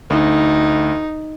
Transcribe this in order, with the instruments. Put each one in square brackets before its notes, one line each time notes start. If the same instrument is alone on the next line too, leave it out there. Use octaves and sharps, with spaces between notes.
[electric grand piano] D2 [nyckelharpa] D#4